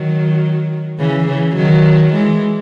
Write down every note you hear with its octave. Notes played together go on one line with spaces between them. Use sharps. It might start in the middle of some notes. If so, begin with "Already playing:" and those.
Already playing: D#3 F#3
C#3 E3
C#3 E3
D#3 F#3
E3 G#3